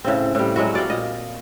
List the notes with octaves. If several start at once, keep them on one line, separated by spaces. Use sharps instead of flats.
A2 C#3 C4
A2 G3
F#3 G#3 E4 F#4
F#4 D5 F5 G5
A#2 D#5